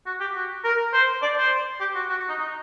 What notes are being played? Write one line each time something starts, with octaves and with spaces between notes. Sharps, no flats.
F#4
G4
F#4
A#4
C5
D5
C5
G4
F#4
F#4
F#4
D#4
D#4